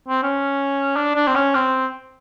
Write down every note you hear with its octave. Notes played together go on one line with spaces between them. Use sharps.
C4
C#4
D4
D4
C4
C#4
C4